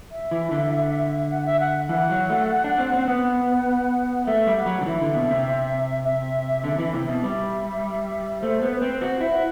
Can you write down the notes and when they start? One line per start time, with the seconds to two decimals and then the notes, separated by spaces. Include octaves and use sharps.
0.11 E5
0.31 E3
0.51 D3
1.30 F#5
1.46 E5
1.60 F#5
1.89 E3 F#5
2.10 F#3
2.30 A3
2.64 D4
2.78 C4
2.93 C4
3.08 B3 F#5
4.27 A3 E5
4.47 G3
4.57 F#5
4.66 F#3
4.81 D3
4.86 E3 E5
5.01 D3
5.16 B2
5.31 C3
6.04 E5
6.64 D3
6.79 E3
6.93 C3
7.08 B2
7.23 G3 E5
8.42 A3 C5
8.62 B3
8.72 B4
8.82 C4
9.01 F#4 C5
9.21 E4
9.30 F#5